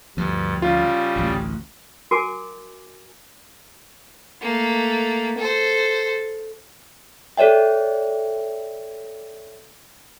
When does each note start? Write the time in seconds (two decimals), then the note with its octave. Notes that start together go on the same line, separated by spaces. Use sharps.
0.17 D2 G2 F3
0.62 C#3 G3 F4
1.16 A1 D2
2.11 F#4 A#4 G#5 D6
4.42 A3 A#3
5.38 A4 C5
7.37 A4 C#5 D5 E5 G5